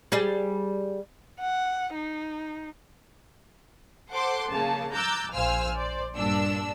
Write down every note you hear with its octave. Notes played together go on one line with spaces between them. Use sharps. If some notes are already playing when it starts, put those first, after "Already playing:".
G3 G#4 D5
F#5
D#4
A4 C5 F#5 C6 D6
C#3 A#3 A5
A#5 D6 E6 F#6 G6 A6
A#1 C5 F5 G#5 E6 F6
C5 D5
G2 A#2 D4 E6